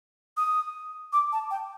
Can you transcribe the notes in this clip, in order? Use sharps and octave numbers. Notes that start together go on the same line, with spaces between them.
D#6
D6
A5
G5